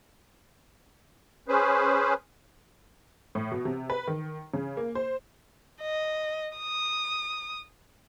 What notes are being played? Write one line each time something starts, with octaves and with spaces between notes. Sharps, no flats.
C#4 G#4 B4 C5
A2
B2
C3
B4
D#3
C#3
A#3
C5
D#5
D#6